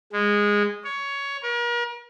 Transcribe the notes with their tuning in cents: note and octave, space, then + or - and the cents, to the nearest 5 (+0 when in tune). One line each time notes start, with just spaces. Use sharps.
G#3 -15
C#5 +15
A#4 +40